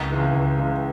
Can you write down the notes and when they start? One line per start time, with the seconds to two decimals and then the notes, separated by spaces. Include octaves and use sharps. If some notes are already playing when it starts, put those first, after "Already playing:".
Already playing: C#2 A#5
0.10 C#3 E3 G#3
0.33 C#2
0.57 C#3 E3 G#3